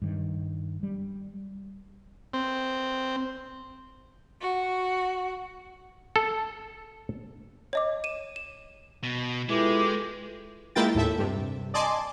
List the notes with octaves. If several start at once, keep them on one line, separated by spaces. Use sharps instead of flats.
G2 D#3
G3
C4
F#4
A4
C#5 D#5 D6
D#7 E7
E7
B2
G#3 E4 F4 G4 A4 B4 D6
G#3 A#3 E4 F4 G5 A6
D#2 A2 A4 E5
G2 C3
D5 D#5 G#5 A5 C6 D6